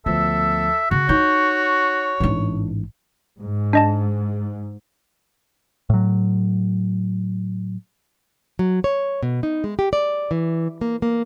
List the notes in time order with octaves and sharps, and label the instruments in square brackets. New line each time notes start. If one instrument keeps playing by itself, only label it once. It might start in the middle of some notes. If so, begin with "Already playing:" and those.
[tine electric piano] D2 F3 [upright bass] B3 [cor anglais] A4 [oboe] E5
[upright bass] C#3 [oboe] F#4
[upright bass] D#4 [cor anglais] C#5 [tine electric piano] G6
[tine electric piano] A1 G#2 [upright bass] E3 D4
[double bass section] G#2
[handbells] D4 D#5 A5
[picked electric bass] A2 F#3
[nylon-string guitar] F#3
C#5
B2
D#4
G#3
G4
D5
E3
A#3
A#3